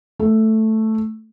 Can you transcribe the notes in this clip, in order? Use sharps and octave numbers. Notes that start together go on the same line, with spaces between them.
A3